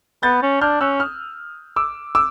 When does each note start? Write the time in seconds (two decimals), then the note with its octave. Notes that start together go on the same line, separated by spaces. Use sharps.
0.23 B3 G6 A6
0.42 C#4
0.61 D4 F6 G6
0.81 C#4 E6 F#6
1.00 D#6 F6
1.76 D6 E6
2.15 D6 E6